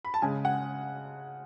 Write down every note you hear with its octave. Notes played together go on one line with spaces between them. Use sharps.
B5
A5
C#3 G#3 G#5
F#5